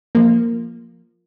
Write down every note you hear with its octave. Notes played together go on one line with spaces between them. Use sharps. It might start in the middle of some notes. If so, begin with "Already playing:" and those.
F3 A#3